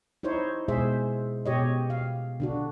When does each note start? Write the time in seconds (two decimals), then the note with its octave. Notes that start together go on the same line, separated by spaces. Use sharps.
0.23 D#4 E4 C5 C#5
0.68 B2 G#3 G#4 C5 E5
1.46 B2 G4 C#5 D#5
1.90 F5
2.40 D3 D4 F#4